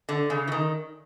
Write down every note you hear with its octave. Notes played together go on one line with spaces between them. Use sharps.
D3
C#3
E3
D#3